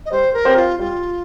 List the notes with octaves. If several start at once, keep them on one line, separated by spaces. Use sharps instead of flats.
D#5
G3 C5
A#4
C4 G4 C5
F4
G3 F4